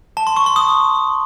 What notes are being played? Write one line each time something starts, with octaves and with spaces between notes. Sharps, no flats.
A5
C6
C#6
C6
D#6